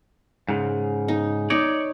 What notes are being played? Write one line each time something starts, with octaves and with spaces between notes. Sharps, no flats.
G#2 C#3
D#4
D#4 C#5 D5